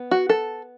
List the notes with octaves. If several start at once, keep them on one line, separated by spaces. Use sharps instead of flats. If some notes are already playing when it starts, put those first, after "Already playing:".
Already playing: B3
F#4
A4